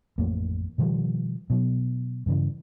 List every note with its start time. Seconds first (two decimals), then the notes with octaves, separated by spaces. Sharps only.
0.18 A1 F2 A3 A#3
0.78 B2 D#3 F3 G3
1.50 B2 F#3
2.26 G2 C#3 E3